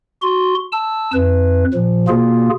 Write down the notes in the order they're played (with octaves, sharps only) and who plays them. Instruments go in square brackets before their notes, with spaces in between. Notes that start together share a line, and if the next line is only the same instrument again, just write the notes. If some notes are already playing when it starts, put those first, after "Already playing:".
[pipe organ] F#4 C6
A5 E6
F2 B4
A#2 F3
B2 A#3 F4 G#4